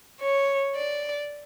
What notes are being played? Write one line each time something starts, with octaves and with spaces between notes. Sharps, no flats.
C#5
D5